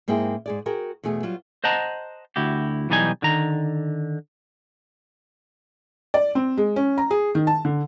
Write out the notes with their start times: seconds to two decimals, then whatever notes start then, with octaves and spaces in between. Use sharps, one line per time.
0.08 G#2 A#3 C4 E4 G#4 G5
0.46 G#2 G#4 D5
0.66 F#4 G#4 A#4 G5
1.04 E2 B2 A3 G#4 G#5
1.23 F#3 G3 F4
1.64 C5 D#5 F#5 A5 A#5
2.36 D2 E4 F#4 G4
2.90 B1 E3 G3 D#4 C5 G#5
3.22 D3 D#3 A#5
6.14 D5
6.35 C4
6.57 G#3
6.76 C#4
6.98 A#5
7.10 G#4
7.35 D#3
7.47 A5
7.65 D3